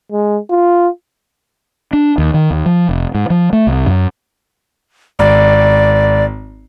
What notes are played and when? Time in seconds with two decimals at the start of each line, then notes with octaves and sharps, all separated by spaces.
0.12 G#3
0.50 F4
1.93 D4
2.18 D#2
2.34 D#3
2.50 D#2
2.66 F3
2.89 F1
3.14 G#2
3.30 F3
3.53 A3
3.67 C2
3.86 F#2
5.19 G#1 D5